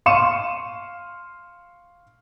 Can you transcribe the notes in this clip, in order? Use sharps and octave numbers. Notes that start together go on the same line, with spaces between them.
F5 C6 C#6 C#7 D#7 E7